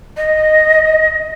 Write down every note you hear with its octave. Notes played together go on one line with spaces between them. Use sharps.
D#5